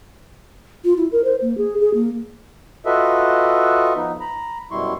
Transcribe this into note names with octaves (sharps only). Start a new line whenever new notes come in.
F4
E4
A#4
C5
A#3
G#4
G#4
A#3
F4 F#4 A4 B4 D#5 E5
F3 B3 D#4
A#5 B5
F#2 B2 G3 E4 C6 C#6